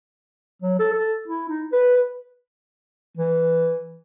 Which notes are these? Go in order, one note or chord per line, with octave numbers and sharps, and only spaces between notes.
F#3
A4
A4
E4
D#4
B4
E3